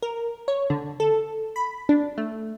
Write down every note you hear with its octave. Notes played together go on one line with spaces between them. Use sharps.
A#4
C#5
D3
A4
B5
D4
A3